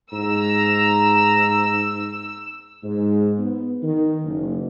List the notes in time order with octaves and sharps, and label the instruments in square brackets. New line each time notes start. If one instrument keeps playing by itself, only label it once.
[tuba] G#2 [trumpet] A#5 [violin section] E6
[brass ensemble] G#2
B3
D#3
F#1